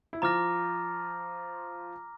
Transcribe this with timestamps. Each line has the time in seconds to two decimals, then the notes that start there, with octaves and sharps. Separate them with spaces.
0.13 E4
0.22 F3 F4 A#5 D6 F6 A#6